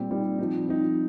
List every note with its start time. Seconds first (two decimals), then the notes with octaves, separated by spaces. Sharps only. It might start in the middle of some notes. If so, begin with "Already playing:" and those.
Already playing: A#2 G3 C4
0.10 A#2 G3 C4 D#4
0.39 F3 C4 D#4
0.69 F3 C4 D#4